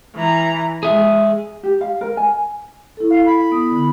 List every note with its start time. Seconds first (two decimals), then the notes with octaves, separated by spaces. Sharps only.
0.16 E3 A#5
0.83 G#3 G#4 E5
1.63 G4
1.81 F5
2.01 A#4
2.17 G#5
2.97 E4 A4
3.10 F5
3.26 B5
3.52 B3 D#6
3.71 D3